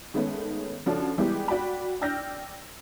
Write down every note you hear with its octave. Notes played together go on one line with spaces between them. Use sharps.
D#3 G#3 A3 B3 C#4
C#3 F3 C#4 D4 F#4 A4
E3 G3 G#3 B3 E4 G4
F#4 D5 G5 B5
D5 G5 E6 F6 G6 A#6